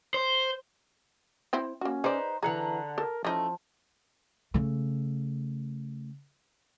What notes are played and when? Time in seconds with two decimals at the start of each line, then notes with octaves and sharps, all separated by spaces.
0.14 C5
1.53 C4 E4 C5
1.81 A#3 C#4 F#4
2.04 D#4 G#4 B4 C5 D5
2.43 D3 E3 G#4 F#5 A#5
2.98 A4 A#4 A5
3.25 E3 F3 A3 C#4 D#4
4.54 C#3 A3